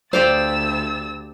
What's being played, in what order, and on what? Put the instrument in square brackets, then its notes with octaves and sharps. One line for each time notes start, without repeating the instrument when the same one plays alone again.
[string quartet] D2 A6 [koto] G4 D5 F5 [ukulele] C5 [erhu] E6